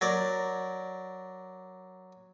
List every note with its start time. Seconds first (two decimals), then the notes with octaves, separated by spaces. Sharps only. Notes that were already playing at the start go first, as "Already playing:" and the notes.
0.01 F#3 A#4 D5